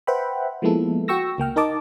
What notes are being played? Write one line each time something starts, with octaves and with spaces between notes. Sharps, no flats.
B4 C5 E5 F#5 G5 B5
F3 G#3 A#3 B3 E4 A4
F#4 G5 C#6 E6 A#6
C#2 A#3 G5 F6
D#4 A#4 D#5 A5 D6